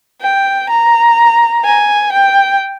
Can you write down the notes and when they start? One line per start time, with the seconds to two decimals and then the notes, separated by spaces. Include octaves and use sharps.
0.22 G5
0.70 A#5
1.65 G#5
2.13 G5